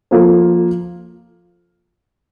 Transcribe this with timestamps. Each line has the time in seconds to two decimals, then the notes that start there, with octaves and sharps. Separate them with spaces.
0.11 F3 A#3 F4 A4 C5